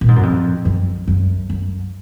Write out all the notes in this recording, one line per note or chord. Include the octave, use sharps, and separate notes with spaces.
A#2
G#2
F#2
F2
F#2
F#2
F#2